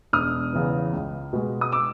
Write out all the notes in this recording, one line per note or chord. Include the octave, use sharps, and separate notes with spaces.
E1 D#6 F6
E2 C#3 E3
C#2
B2 G#3
D#6
D6 E6